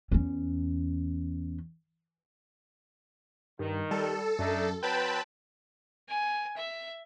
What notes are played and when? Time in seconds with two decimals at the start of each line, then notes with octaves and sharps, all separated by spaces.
0.12 E2 C#4
3.59 G2 D#3
3.91 G3 A4
4.39 F#2 A3 D4 D#4
4.83 F#3 C4 B4 G5 A5 B5
6.08 G#5
6.56 E5